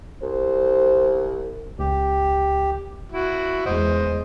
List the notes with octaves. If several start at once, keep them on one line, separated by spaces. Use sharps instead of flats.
C2 C5
C#2 G4
E4 F#4
E2 G#3 C5 D#5